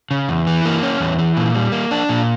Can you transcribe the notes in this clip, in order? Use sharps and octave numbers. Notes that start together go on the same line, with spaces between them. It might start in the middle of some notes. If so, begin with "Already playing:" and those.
C#3
E2
E3
A#3
C#4
E2
E3
A#2
G3
A#3
D4
A#2